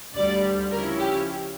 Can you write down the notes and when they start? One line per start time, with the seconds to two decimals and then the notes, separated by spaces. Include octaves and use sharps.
0.14 D2 D3 G3 D5
0.71 C#3 F3 C#4 E4 A#4
1.00 G4